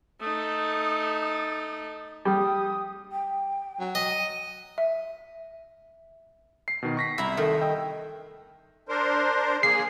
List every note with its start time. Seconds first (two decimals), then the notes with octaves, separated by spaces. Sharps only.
0.20 A3 D#4 D#6
2.25 G3 D#6
3.11 G5
3.79 F#3
3.95 D#5 D#7
4.78 E5
6.68 C7
6.83 B2 D#3
6.97 C#6 A#6 B6
7.18 C2 E4 A#5
7.37 D#3 A3
7.61 D#5 G5 E6
8.89 D4 A#4 C5
9.63 A#3 G#4 C7